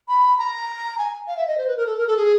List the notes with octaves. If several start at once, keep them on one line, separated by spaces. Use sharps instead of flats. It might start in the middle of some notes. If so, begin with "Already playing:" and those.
B5
A#5
G#5
F5
E5
D#5
C5
B4
A#4
A4
A#4
A4
G#4